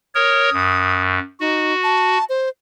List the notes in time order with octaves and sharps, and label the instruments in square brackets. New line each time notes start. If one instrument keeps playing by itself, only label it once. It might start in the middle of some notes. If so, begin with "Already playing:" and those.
[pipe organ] A#4 C#5 [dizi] D#6
[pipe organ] F#2
[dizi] D#4 [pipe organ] F#4
[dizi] A5
C5